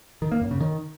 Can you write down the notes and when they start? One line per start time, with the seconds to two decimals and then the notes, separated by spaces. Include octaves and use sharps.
0.22 D#3
0.32 A#3
0.41 F#2
0.51 C#3
0.60 D#3